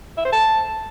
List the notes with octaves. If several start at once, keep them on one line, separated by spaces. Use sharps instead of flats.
E5
C5
A5